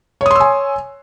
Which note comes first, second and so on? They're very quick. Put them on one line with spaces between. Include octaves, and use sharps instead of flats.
C#5 D#6 C6 E6 G#5